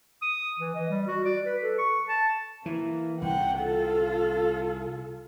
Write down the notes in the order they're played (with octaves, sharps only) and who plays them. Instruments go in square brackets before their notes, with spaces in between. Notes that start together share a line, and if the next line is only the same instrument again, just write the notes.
[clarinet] D#6
E3
D#5
G3
F#4
D5
B4
A4
C#6
A5
[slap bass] E3 [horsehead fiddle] A#3
[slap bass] C2 [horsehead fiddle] F#5 G5
[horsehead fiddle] F4 A4